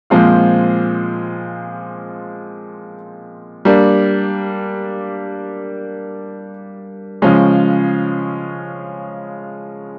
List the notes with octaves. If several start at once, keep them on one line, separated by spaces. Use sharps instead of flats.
A#2 F3 G#3 C4 F4
G3 A#3 D4
C#3 F3 G#3 C#4